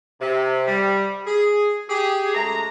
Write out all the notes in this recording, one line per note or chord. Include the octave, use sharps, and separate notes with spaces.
C3
G3
G#4
G4 G#4
F#2 G#3 A3 A#5